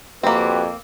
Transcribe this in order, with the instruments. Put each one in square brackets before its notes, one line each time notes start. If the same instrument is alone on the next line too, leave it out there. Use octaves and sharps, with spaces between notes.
[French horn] F2 [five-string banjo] A#3 C4 [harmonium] F#4 G4 B4